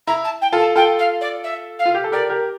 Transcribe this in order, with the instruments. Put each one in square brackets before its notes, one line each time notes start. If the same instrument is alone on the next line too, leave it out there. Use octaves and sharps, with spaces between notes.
[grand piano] E4 [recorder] A#5
[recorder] A5
G5
[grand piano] F4 A4
[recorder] A5
[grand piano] F4 A4 [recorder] G5
[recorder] F5
D5
E5
F5
[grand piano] F4
G4
A4
[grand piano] G4 A#4 [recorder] D5
[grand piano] G4 A#4